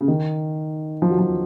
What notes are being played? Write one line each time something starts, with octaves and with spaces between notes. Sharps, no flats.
C#3
D#3
F3
F#3
F3